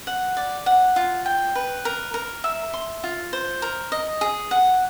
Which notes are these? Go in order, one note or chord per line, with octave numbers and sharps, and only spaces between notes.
F#5
D5
F#5
F4
G5
B4
A#4
A#4
E5
C6
F4
C5
A#4
D#5
G#4
F#5